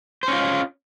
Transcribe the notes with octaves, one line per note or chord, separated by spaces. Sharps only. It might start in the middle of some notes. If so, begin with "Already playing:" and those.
C#4 F4 C5